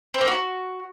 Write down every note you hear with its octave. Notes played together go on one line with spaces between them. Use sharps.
C4
A#3
F#4